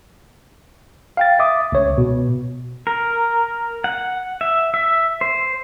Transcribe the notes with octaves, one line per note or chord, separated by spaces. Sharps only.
F5 G5 A6
E5 D6 D#6
C#2 C#5
B2
A#4
F#5
E5
E5
C5